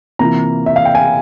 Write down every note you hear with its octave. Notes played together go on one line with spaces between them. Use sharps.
C3 E3 A#3 F4 A#5
E5
F5
G5
G#5